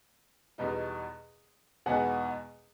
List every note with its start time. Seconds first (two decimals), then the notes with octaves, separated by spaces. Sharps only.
0.58 E2 B2 G3 B3 D#4
1.86 E2 B2 G#3 B3 D#4 F#5 G#5